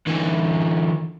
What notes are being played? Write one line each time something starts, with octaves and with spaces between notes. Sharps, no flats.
D3 E3